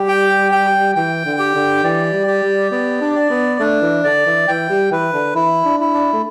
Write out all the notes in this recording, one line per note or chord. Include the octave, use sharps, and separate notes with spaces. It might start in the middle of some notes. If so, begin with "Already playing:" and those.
Already playing: G3 G4
G5
G5
E3 G5
D3
G4
D3
E3 D5
G3
G4
G3
B3 D5
D4
D5
B3
A3 D4
E3
D3 D5
E3
E3 G5
G3
E3 B4
D3
E3 E4
D4
E4
D4
A3